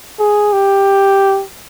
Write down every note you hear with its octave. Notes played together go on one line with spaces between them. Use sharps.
G#4
G4